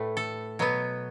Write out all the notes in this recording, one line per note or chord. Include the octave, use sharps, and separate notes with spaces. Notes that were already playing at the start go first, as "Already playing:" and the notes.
Already playing: A2 A3 B4
A4
B2 F#3 B3